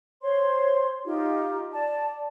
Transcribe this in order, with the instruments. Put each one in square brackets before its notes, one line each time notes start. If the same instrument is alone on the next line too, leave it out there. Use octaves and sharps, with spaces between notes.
[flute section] C5 C#5 C6
D#4 F4 G4
D5 A5